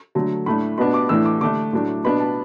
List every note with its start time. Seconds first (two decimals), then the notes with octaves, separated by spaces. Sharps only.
0.15 D3 F#3 A3
0.46 A2 A3 D4 B5
0.78 B2 B3 D4 B5
0.94 D6
1.09 A2 E3 A3 D4 E6
1.25 D6
1.41 D3 A3 D4 D6
1.73 A2 F#3 A3 D4
2.04 B2 B3 D4 B5
2.20 A5